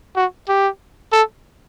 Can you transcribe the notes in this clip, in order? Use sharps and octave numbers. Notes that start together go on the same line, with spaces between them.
F#4
G4
A4